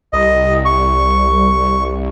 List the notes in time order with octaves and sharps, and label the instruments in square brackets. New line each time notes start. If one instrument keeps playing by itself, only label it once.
[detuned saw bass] C2 [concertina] D#5
[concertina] C#6